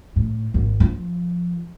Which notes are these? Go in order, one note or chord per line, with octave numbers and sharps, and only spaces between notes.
A2
G#1
F3